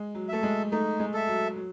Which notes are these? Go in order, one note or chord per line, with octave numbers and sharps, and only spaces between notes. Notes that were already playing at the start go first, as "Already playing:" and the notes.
Already playing: G#3
F#3
A3 A4 E5
G#3
A3 D#4
G#3
A4 E5
F#3
F#3